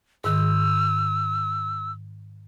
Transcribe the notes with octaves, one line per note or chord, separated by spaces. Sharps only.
G#2 D#3 E6